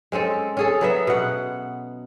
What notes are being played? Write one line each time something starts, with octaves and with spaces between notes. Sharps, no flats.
G#3 C4 C#4 A4
C#4 G#4 A4
F#3 B3 E5
B2 F#5